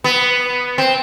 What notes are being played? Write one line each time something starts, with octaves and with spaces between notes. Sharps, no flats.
B3
C4